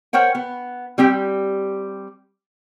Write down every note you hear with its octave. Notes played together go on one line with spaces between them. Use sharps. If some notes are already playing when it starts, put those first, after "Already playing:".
A#4 C5 C#5 F#5 G5
B3
G3 C4 G4